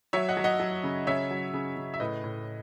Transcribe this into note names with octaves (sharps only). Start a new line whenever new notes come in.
F#3 C#5 E5
D#5 F#5
F#3
D#5 F#5
F#3
C#3
C#3 C#5 E5
F#3
C#3
C#3
E5
A2 B4 D#5
A2